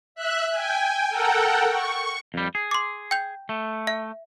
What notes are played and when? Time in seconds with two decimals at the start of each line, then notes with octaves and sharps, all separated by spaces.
0.15 E5 F#6
0.51 G5 G#5
1.09 A4 A#4 F#5 G5
1.70 C#6
2.34 F2 G3
2.55 G#4
2.71 C6 D6
3.11 G5 G6
3.49 A3
3.87 E5